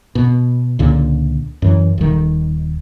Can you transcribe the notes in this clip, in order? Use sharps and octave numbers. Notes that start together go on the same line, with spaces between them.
B2
C#2 A#2 D3
F#2 E3
D#1 D#3